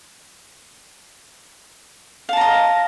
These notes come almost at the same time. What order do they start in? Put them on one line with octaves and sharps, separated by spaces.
F5 A5 A#5 D#5